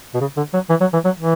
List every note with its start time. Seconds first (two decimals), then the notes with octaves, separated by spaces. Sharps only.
0.14 B2
0.20 C#3
0.37 D3
0.53 F#3
0.69 E3
0.80 F#3
0.93 E3
1.05 F#3
1.18 E3